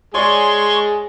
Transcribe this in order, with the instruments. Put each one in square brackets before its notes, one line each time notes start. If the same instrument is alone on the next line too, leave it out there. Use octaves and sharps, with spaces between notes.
[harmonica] G#3 G#4 [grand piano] C#5 D5 G#5 [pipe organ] C6 C#6